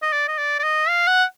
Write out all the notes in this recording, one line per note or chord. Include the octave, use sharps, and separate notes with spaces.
D#5
D5
D#5
D5
D5
D#5
F5
F#5